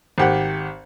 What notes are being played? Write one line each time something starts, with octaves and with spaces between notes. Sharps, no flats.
G#1 G4 F#5